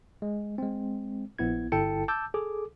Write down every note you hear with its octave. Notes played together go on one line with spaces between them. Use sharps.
G#3
G#3 C4
A#1 B3 E4 G#6
G1 E4 A4 G5 A5 C#7
A5 D6 E6 G6
G#4 A4 D6